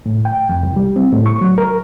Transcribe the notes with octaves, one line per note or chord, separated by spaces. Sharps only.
A2
G5
F2
C2
G3
C4
A2
C#6
F#3
A#4